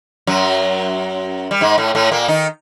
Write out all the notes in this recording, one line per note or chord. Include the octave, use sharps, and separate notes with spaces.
F#2 F#3
G3
G#2 G#3
A2 A3
A2 A3
A#2 A#3
D#3 D#4